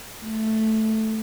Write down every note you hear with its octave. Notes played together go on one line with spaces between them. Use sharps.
A3